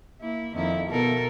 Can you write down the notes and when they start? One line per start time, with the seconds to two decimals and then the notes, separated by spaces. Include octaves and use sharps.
0.21 A#3 E4
0.55 F2 D#3 E4
0.90 B2 A4 A#4